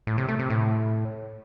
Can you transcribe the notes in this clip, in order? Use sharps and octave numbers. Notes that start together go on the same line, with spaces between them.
A2
C3
A3
C3
A2